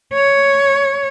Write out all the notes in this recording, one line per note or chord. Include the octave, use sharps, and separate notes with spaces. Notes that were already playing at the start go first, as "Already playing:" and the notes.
C#5